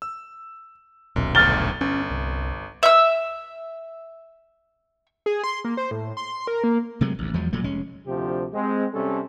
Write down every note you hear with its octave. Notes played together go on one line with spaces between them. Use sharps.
E6
D#1 B1 F#2 B2
G1 D2 F6 A6 G7
G1 C#4
C2
E5 E6
G#4
C6
A#3
C5
A2
C6
A#4
A#3
C3 F#3 G#3 A3
A1 D2
E2 F3 F#3 G#3
E1 A#2 F#3 A3
F1 G#3 C#4
D2 C3 F3 D4 G4
G#3 C4
C3 G3 C#4 A4